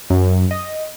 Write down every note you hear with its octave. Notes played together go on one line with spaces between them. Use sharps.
F#2
D#5